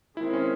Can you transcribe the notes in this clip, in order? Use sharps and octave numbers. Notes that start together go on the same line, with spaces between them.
D#3 G#3 C4 E4
C#4